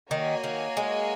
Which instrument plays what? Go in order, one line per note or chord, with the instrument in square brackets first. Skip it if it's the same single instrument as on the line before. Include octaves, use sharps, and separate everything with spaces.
[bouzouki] D#3 [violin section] A#3 F#4 C#5 G#5
[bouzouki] D#3
G#3